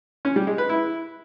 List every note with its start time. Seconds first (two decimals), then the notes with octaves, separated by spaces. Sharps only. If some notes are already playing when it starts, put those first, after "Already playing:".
0.25 C#4
0.36 G3
0.47 G#3
0.58 B4
0.69 E4